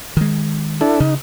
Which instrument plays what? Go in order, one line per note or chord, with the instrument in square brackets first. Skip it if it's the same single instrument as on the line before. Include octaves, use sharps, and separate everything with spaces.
[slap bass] D#3 G#3
[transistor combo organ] D4 E4 A4
[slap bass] C#3 [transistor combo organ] D#4